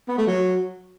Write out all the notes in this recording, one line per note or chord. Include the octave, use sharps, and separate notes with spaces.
B3
A3
F#3